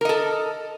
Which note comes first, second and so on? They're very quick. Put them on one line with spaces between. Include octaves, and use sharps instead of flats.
A#4 D#5 A4